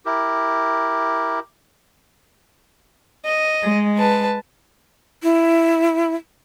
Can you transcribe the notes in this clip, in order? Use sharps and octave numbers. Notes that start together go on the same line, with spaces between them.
E4 G4 A#4
D#5
G#3
B4 A5
E4